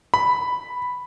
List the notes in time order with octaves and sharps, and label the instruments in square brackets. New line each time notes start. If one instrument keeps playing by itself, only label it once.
[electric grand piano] B5